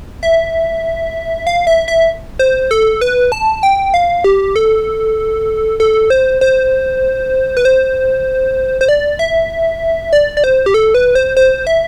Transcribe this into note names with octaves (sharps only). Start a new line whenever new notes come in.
E5
F5
E5
E5
C5
A4
B4
A5
G5
F5
G4
A4
A4
C5
C5
B4
C5
C5
D5
E5
D5
D5
C5
G4
A4
B4
C5
C5
E5